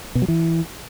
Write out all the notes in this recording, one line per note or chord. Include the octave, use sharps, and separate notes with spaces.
B2
F#3
E3